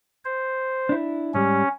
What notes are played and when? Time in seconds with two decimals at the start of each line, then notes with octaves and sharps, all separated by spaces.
0.25 C5
0.89 D4 E4
1.34 G#2 G3 C#4